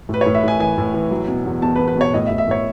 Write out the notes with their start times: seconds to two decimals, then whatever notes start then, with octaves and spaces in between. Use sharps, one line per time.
0.09 A2 B4
0.21 A2 C#5
0.35 E5
0.43 A2 G#5
0.60 E3 G#5
0.78 A2
0.94 E3
1.11 F#3
1.28 B2
1.45 E2
1.62 E2 A5
1.76 B4
1.79 E2
1.88 B4
1.96 B2
2.01 C#5
2.14 A2 D#5
2.26 E5
2.31 A2
2.38 E5
2.47 A2 C#5